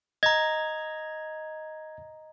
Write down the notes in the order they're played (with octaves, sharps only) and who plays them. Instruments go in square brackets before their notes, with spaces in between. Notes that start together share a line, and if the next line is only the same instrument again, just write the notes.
[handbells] D#5 A#5 [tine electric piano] G#6